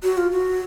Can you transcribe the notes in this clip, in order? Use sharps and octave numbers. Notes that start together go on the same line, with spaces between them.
F#4
F4
F#4